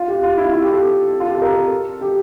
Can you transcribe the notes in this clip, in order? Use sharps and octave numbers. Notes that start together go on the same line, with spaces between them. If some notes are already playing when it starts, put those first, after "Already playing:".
Already playing: F4
G4
F4
E4
F4
G4
A4
F4
G4
A4
A#4
A4
G4